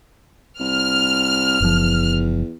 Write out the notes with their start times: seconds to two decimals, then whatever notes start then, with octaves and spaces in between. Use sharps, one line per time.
0.60 C2 F6
1.61 F#1 E2 F3